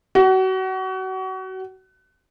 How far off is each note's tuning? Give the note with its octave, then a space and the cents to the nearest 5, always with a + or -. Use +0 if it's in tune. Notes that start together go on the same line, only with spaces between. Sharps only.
F#4 +30